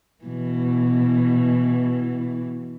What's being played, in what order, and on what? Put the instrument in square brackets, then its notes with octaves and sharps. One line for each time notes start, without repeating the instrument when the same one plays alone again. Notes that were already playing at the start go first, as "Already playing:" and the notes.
[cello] B2 E3